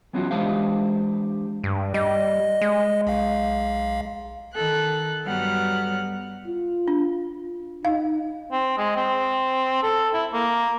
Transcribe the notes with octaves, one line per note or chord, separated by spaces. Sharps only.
E3 F#3 B3 C#4 F4 F#4
E3 G#3 D4 G4 C5 F5
G2
G3 D#5
G#3
B1 F5
D#3 A4 F#6
G2 F#3 G3 B3 F#5 F6
F4
D4
D#4 F5
C4
G#3
C4
A4
E4
A#3